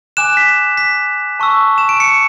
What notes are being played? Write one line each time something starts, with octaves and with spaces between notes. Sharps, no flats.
G#5 D6 F#6 E7
B6
B6
A5 C#6 E6
E7
D7
C#7